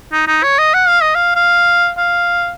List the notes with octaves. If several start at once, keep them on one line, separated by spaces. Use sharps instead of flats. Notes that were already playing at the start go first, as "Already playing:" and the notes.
D#4
D#4
C#5
D#5
F#5
F5
D#5
F5
F5
F5